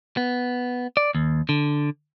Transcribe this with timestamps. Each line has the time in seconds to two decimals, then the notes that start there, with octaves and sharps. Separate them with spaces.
0.17 B3
0.97 D5
1.15 D#2
1.49 D3